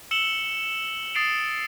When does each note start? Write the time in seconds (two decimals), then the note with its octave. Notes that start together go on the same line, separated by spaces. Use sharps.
0.11 E6 C#7 E7 F#7 G7
1.14 D#6 A6 C7 D7 F7